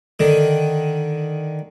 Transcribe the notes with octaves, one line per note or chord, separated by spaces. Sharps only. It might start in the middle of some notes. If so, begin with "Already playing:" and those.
D3 D#3